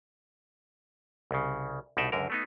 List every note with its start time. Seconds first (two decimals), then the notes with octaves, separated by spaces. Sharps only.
1.31 C2 C#3
1.97 C2 B2 D#4 D5 E5 G5
2.12 C#2 F#2 D3 A#4
2.30 A3 B3 D#4